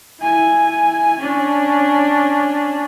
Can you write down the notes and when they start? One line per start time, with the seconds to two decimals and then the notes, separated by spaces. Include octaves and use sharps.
0.20 E4 G#5
1.18 C#4 D4